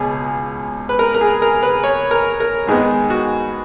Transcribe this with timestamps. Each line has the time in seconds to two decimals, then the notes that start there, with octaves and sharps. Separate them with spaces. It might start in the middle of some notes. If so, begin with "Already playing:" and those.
Already playing: C#2 B2 G#4
0.89 B4
0.99 A#4
1.14 A#4
1.21 G#4
1.42 A#4
1.63 B4
1.83 C#5
2.11 A#4
2.40 A#4
2.67 G#2 D#3 G#3 B3 G#4
3.10 F#4